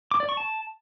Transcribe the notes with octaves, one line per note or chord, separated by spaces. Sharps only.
D6
D5
C#6
A5